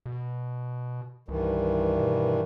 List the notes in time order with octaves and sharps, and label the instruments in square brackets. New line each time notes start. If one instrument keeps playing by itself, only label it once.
[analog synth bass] B2
[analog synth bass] C2 [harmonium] G2 D#3 E3
[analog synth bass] B2